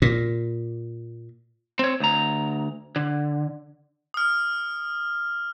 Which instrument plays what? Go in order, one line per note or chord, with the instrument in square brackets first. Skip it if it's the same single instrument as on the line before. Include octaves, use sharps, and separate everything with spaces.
[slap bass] A#2
[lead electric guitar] C4 C#5
D2 A#5
D3
[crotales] D#6 F6